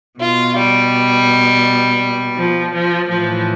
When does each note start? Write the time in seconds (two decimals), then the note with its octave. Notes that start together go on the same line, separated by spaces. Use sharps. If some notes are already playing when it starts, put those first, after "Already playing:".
0.19 B2 F4
0.55 G3
2.36 F3
2.73 F3
3.08 A2 E3 F3